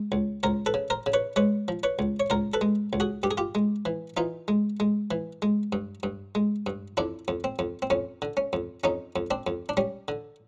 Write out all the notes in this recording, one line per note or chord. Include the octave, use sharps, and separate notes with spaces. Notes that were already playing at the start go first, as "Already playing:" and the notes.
Already playing: G#3
C#2
C#2 A#4 C5
A4 B4
C#3
A#4 C5
C#3
B4 C#5
G#3 B4 C#5
F3
B4 C#5
C#2
C#5
C#2 A#4 C5
A4 B4
G#3
C#2
F#4 G#4
G2 G4
G#4
F4 G4
G#3
E3
E3 D#4 F4
G#3
G#3
E3
G#3
G2
G2
G#3
G2
F2 D4 E4
F2
C4
F2
C4
F2 C#4
D3
C#4
F2
F2 C#4 D#4
F2
C4 D4
F2
D4
G3 C#4
D3